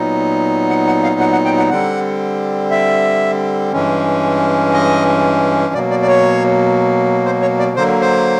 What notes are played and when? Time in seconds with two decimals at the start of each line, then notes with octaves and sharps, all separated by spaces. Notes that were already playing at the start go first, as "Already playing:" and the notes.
Already playing: A#2 F#3 B3 D#4
0.69 F#5
0.87 F#5
1.03 F5
1.20 F#5
1.32 F#5
1.45 G5
1.58 F#5
1.70 D3 G3 C4 F#5
2.71 E5
3.72 G2 E3 G#3 C#4
4.73 D#5
5.74 B2 F#3 A#3 D5
5.90 D5
6.02 D5
6.08 C#5
7.26 C5
7.42 C#5
7.59 D5
7.76 D3 F#3 A#3 C5
8.01 C5